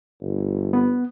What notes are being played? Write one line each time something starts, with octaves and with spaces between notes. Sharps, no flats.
G1
B3